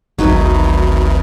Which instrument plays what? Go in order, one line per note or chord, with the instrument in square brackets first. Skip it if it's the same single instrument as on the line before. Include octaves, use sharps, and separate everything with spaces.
[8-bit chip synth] G#1 D2 [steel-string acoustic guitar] F#3 D#4 B4